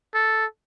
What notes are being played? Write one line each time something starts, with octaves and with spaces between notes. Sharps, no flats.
A4